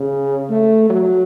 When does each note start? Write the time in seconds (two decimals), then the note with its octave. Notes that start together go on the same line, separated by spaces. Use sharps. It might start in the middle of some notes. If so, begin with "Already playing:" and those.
Already playing: C#3
0.50 A3
0.90 F#3